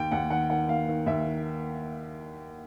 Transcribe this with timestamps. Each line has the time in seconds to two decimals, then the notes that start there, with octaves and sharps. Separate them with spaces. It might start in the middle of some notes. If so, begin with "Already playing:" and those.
Already playing: D#2 G5
0.11 D#2 F#5
0.30 D#3 F#5
0.50 D#3 F#5
0.69 D#2 F5
0.88 D#3
1.06 D#2 E5
1.26 D#3